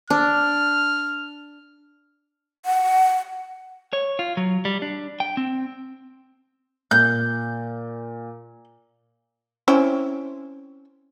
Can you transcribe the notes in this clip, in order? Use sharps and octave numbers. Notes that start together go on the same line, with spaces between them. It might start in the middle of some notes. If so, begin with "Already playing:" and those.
D4 F6
F#5
C#5
F4
F#3
G3
D4
G5
C4
A#2 G6
C4 C#4 E4